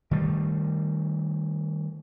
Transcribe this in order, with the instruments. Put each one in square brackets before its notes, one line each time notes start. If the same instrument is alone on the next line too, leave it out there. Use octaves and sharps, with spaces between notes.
[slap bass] D#3 G3 A3